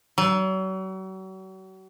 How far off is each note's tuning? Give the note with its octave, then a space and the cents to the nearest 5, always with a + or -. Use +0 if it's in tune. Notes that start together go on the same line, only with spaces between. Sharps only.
F#3 +40